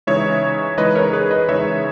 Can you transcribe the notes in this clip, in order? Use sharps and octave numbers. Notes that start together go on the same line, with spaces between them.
C#3 E3 G#3 D#4 C#5 E5
C#3 E3 G#3 D#4 B4 D#5
A#4 C#5
G#4 B4
B4 D#5
C#3 E3 G#3 D#4 C#5 E5